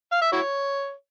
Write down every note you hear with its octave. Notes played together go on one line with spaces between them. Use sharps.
F5
E5
E4 F#4 C#5